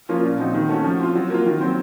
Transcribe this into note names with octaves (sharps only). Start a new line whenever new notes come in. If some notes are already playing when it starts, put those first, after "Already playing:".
F3 A#3 C#4 F4
A#2
F3 C4 D#4 F#4
D#3
A3 C#4 F#4
F3
C4 F4
F#3
A#3 F4
D#3
F#3 C4